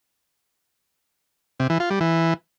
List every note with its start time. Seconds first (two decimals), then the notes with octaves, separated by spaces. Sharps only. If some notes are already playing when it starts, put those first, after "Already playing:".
1.60 C3
1.70 E3
1.80 F4
1.90 G3
2.01 E3